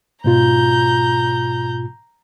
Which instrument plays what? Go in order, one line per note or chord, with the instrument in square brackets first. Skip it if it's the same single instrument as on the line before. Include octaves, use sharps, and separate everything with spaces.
[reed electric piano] G#2 B2 F4 [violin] A#5 G6